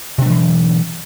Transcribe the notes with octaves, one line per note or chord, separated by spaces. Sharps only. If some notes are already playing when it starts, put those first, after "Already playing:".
B2 E3 F#3 D4